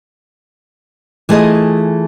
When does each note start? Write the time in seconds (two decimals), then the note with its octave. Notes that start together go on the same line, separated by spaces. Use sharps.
1.29 E3 A3 F4 G#4 D#5